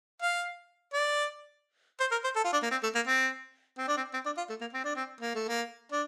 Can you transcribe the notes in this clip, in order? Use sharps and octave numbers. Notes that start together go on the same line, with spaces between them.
F5
D5
C5
A#4
C5
A4
F4
D4
A#3
C4
A3
A#3
C4
C4
D4
C4
C4
D4
F4
A3
A#3
C4
D4
C4
A#3
A3
A#3
D4